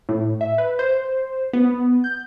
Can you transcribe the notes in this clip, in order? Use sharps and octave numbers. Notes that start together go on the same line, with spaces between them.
A2
E5
B4
C5
B3
G6